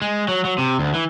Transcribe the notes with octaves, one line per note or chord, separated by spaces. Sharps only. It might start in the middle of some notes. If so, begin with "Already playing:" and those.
G#3
F#3
F#3
C3
D2
E3